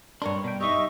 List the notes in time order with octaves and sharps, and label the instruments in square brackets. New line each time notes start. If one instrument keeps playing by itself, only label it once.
[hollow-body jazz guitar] G2 C6 [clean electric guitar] D4 A#4 C#5
[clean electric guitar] B2 G5
[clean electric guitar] D#4 G4 [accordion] D#5 E5 [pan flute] C#6